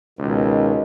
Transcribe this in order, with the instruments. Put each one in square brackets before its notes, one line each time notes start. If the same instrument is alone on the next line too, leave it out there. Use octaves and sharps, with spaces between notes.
[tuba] C#2 [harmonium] B2 D#3